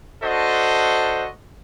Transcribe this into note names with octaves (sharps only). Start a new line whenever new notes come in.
D4 F#4 A4 C5 D#5